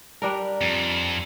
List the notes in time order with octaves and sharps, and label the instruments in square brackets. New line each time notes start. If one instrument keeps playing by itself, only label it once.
[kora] G3 D4 A#4
[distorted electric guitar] F2